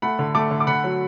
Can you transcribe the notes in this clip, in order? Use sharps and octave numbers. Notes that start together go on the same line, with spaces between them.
A3 F#5 B5
D3
A3 A5 D6
D3
D6
D3 F#5 B5
F#3